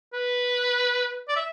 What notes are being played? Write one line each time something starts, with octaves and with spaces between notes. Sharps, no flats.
B4
D5
E5